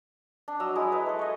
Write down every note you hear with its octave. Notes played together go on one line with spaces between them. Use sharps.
D4
F#3 D#5 A#5 E6
G#3 E4 D#6
B4
A3 A4
C#5 D#5